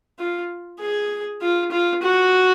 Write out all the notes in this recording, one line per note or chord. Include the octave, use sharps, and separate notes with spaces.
F4
G#4
F4
F4
F#4